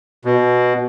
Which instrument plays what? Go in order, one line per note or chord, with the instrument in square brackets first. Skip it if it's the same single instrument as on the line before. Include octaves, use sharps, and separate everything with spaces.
[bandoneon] B2